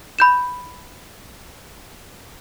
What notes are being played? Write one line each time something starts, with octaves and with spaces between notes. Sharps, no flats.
B5 G6 E7